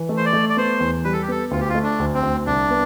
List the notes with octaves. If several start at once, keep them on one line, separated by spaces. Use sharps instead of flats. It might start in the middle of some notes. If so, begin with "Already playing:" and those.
Already playing: E3
A3
C5
D5
A3
D5
B3 C5
E2
G3 B4
A4
G4
B3 A4
D2 F4
G4
F4
A3
D4
D2
C4
D2
C2 D4
B3